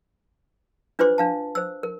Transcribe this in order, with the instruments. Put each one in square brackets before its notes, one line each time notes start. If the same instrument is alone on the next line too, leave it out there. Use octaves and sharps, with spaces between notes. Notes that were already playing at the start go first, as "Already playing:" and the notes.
[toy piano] D4 F4 B4 C5 C6 D6
D4 F5 A5
C5 E6
A#4